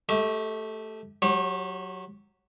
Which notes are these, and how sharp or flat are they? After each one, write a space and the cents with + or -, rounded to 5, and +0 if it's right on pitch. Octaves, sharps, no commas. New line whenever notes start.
A3 +0 G4 +0 E5 -45
F#3 +0 G4 +0 C#5 -40